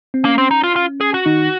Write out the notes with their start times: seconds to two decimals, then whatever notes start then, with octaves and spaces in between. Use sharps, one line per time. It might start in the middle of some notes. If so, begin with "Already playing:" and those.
0.14 C4
0.25 A#3 C#4
0.38 C4
0.51 D#4
0.63 F4
0.76 F4
1.01 G#4
1.14 F#4
1.26 D#3 D#4